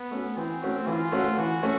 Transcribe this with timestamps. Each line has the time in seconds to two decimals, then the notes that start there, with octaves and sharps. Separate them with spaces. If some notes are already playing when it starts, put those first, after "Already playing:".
Already playing: B3
0.11 A3 C#4 F#4
0.37 E3 C4
0.62 A3 C#4 F#4
0.87 E3 F4
1.12 A3 C#4 F#4
1.37 E3 F#4
1.63 A3 C#4